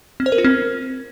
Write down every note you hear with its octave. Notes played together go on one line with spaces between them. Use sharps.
C4
C5
A#4
F4
C4